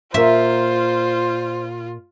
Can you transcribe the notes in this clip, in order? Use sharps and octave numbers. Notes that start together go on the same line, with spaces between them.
A#2 F4 A#4 C5 E5